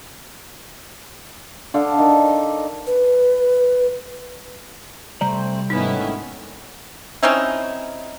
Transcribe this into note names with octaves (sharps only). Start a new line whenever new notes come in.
D3 D4 A4 F5
D#3 D#5
B4
C3 G3 A3 C4 C5 D5 A#5
G#1 A2 D#3 B3 C#4 D#4 E4
C4 C#4 D#4 E4